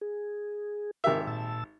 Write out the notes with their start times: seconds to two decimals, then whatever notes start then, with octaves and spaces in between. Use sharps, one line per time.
0.01 G#4
1.04 G#1 G4 A#4 E5
1.27 A#2 A5 E6